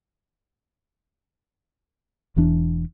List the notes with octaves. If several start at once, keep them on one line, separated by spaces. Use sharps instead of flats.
E1 E2 E3 D4